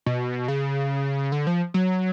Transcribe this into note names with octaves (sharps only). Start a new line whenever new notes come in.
B2
C#3
D3
F3
F#3